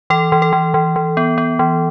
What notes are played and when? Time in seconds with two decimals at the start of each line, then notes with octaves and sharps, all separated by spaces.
0.10 E3 A4
0.32 E3
0.42 A4
0.53 E3
0.74 E3
0.96 E3
1.17 B3
1.38 B3
1.59 E3